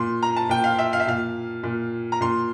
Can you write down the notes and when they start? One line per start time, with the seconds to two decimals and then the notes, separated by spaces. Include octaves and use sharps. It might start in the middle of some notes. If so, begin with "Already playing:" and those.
Already playing: A#2 C6
0.23 A#5
0.36 A5
0.49 A#2 G5
0.64 F5
0.79 E5
0.93 F5
1.00 E5
1.07 A#2 F5
1.63 A#2
2.12 A#5
2.21 A#2 C6